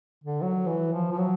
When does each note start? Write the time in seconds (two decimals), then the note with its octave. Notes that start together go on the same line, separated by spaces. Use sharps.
0.24 D3
0.42 F#3
0.67 E3
0.93 F3
1.12 F3
1.18 F#3